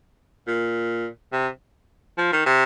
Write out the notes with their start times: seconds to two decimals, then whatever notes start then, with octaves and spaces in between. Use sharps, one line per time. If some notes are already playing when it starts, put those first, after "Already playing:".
0.47 A#2
1.32 C3
2.18 F3
2.32 D#3
2.46 C3